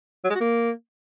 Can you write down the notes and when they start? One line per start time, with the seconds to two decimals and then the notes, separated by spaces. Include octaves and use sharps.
0.25 F#3
0.30 G#3
0.35 F#4
0.41 A#3